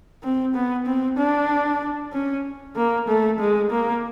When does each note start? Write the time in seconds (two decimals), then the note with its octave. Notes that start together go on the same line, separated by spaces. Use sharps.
0.23 C4
0.55 B3
0.86 C4
1.18 D4
2.13 C#4
2.76 A#3
3.08 A3
3.40 G#3
3.71 A#3